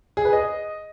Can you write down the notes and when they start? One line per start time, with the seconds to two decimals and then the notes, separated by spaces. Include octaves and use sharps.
0.17 G#4
0.25 B4
0.33 D#5